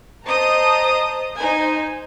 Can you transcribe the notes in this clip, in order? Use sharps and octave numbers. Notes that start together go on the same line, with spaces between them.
C5 D#5 A5 A#5 D#6
D#4 C5 G#5